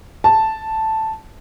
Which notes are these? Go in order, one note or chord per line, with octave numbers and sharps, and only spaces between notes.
A5